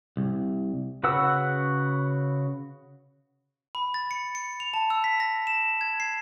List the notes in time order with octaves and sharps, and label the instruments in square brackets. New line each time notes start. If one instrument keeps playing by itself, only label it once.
[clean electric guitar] C2
[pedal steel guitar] C#3 F#4 B4 F#5 E6
[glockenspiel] B5
A6
C#7
C#7
F7
A5
E6
B6
A#6
E7
G#6
C7